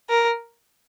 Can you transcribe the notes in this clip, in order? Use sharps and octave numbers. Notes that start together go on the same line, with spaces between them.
A#4